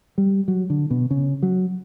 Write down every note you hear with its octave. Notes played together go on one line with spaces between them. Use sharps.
G3
F#3
D3
B2
C#3
F#3